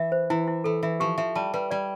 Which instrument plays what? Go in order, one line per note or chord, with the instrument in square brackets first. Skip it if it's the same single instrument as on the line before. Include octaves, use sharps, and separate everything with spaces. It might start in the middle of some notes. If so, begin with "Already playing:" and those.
Already playing: [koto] E3 [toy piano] E5
[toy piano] C5
[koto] E3 [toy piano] E4
[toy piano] E4
[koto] E3 [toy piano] A4
[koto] E3 [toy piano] E5
[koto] F3 [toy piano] G4
[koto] F3 [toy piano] E5
[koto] G3 [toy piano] A5
[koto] G3 [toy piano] B4
[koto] G3 [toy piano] D5